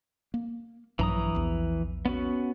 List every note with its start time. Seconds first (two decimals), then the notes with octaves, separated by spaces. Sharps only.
0.34 A#3
0.99 A#1 G2 E3 F#3 A#5 D#6
1.35 A#1 E2
2.05 B3 C#4 F#4